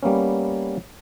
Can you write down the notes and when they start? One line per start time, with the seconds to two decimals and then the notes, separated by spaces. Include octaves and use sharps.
0.03 G3 A#3 B3 C#4